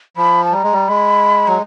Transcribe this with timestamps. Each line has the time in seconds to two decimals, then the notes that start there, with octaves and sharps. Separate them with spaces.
0.17 F3 B5
0.44 A5
0.52 G3 A#5
0.63 G#3
0.73 G3
0.88 G#3 B5
1.47 F#3 A#5